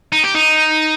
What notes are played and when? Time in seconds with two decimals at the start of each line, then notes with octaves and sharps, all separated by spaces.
0.12 D#4
0.23 G4
0.35 D#4